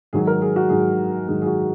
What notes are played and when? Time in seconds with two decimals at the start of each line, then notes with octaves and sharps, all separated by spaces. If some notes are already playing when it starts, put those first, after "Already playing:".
0.13 G#2 D#3 F#3 G#4
0.27 A#4
0.42 G#4
0.56 F#4
0.69 G#2 D#3 F#3 G#4
1.28 G#2 D#3 F#3 G#4
1.42 G#4
1.46 F#4